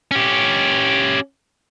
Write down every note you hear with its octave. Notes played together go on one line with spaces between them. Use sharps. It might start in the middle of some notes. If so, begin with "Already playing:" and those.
C#4 G4